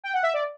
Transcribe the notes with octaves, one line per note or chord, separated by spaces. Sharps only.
G5
F#5
E5
D5